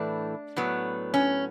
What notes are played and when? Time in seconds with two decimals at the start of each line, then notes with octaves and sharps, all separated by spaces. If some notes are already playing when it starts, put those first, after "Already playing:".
Already playing: A2 E3 A3 D4
0.57 A2 F#3 B3
1.14 C#4